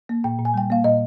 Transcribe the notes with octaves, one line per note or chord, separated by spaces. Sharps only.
A#3
A#2 G5
A#2
G#5
G3 G5
A#3 F5
A#2 D#5